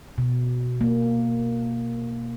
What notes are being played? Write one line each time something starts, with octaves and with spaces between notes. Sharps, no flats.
B2
A#3